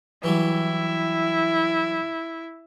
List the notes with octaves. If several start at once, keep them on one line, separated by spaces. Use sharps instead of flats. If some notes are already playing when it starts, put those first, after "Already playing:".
E3 F#3 G3 E4